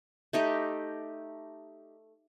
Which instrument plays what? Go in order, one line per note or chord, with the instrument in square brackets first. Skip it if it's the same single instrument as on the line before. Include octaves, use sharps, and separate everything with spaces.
[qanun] A3 D#4 G4